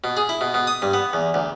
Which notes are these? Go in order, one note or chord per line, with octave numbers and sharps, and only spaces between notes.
B2
G#4
E4
B2
B2
D#6
G2
B3
E2
D2